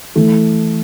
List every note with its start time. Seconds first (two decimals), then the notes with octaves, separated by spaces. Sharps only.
0.16 E3 A3